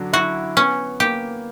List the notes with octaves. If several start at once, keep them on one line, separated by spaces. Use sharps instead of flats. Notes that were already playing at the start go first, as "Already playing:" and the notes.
Already playing: D3 F#3 D4
E4 F#4
B3 C#4
A#3 G4